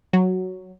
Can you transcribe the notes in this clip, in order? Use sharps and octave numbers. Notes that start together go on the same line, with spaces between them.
F#3